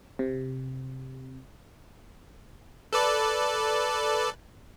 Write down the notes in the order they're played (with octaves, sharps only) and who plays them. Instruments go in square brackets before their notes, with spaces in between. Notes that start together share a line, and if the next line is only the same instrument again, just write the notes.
[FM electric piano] C3
[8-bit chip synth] A4 B4 D5